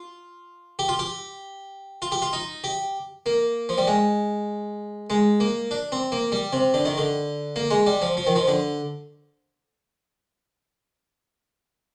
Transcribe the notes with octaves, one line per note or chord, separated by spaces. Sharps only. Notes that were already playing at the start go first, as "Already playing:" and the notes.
Already playing: F4
G4
F4
G4
F4
G4
F4
D#4
G4
A#3
F3
G3
G#3
G#3
A#3
D4
C4
A#3
G3
C3
D3
D#3
D3
A#3
G#3
G3
F3
F3
D#3
F3
D3